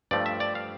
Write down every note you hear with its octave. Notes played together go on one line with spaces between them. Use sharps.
G2 F3 A3 D5
E5
D5
F5